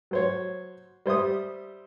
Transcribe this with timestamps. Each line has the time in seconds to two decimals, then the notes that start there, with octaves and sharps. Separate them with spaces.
0.11 F#3 C5 C#5
1.06 G3 C5 E5 D#6